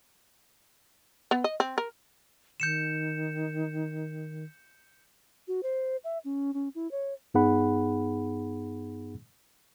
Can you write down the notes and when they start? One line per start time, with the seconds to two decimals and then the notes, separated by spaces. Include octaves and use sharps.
1.31 B3
1.44 D#5
1.60 C4
1.78 A#4
2.60 D#3 G6 C#7 E7
5.48 F#4
5.63 C5
6.04 E5
6.25 C#4
6.54 C#4
6.75 E4
6.91 C#5
7.34 G2 B3 D#4 G#4 F#5 B5